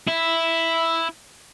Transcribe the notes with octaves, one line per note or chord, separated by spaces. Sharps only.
E4